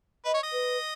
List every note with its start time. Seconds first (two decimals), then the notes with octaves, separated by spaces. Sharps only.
0.25 B4 D#5
0.34 C#5
0.43 D#5
0.53 B4